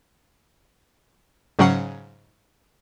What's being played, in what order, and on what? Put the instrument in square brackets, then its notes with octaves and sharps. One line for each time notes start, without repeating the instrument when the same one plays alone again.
[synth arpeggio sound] G#2 C#3 F#3 C#4 F#5 C7